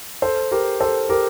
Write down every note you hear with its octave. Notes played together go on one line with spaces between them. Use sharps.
A4 C5
G4 A#4
A4 C5
G4 A#4